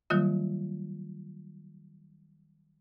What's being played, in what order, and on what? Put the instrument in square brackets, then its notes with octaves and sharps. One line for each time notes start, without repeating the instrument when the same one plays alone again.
[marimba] D#3 F#3 G3 A#3 F4 D#5